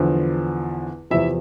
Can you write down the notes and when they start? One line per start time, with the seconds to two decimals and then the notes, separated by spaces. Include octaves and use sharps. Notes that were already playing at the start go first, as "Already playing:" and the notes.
Already playing: E2 D3 F3
1.10 E2 C3 F3 E4 E5